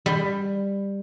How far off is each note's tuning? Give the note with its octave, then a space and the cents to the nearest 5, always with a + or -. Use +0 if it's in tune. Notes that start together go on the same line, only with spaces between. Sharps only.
G3 +15